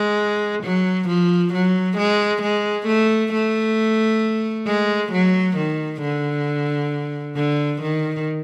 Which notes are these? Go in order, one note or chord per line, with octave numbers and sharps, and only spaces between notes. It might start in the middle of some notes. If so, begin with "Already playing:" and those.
Already playing: G#3
F#3
F3
F#3
G#3
G#3
A3
A3
G#3
F#3
D#3
D3
D3
D#3